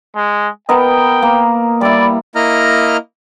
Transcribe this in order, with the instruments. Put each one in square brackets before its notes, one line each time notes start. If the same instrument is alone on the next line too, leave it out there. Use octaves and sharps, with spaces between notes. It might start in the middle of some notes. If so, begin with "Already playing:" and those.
[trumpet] G#3
[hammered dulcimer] B3 A#4 D#5 [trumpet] G5
[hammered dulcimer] A#3
[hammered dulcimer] G3 E4 [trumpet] D5
[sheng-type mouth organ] A#3 E4 D#5 A#5 F6